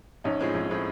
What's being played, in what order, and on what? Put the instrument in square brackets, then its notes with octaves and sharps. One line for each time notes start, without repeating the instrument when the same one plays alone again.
[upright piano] A#1 [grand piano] C#4 D#4
[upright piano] A2 F3 G#3 C4
A#1
A2 F3 G#3 C4